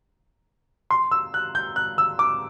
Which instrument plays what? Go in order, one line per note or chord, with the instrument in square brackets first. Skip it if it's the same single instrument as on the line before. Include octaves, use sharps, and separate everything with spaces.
[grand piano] C6
E6
F#6
G6
F#6
E6
D6